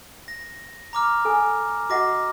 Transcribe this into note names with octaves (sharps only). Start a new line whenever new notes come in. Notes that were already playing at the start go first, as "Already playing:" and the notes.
A#6
A#5 D6 F6
A4 G#5
F#4 D#5 F#5 D6 A#6